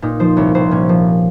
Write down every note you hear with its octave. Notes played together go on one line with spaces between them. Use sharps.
A#2 D#4
F3 C5
C2 C#5
C2 C5
A#2 C#4
F3